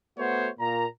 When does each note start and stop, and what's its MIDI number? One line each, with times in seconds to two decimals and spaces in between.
0.18 0.49 57
0.18 0.49 59
0.18 0.49 66
0.18 0.49 72
0.18 0.49 73
0.60 0.86 46
0.60 0.86 82